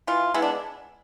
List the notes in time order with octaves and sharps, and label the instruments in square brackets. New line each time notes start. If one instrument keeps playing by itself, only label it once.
[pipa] E3 F4
G#3 B3 E4
D4